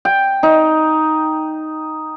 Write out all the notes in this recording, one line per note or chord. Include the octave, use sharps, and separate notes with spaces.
G5
D#4